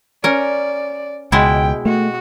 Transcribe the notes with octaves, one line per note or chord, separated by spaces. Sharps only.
C#4 A#4 D5
C#2 B2 G#3 E4 G5
A3 F#4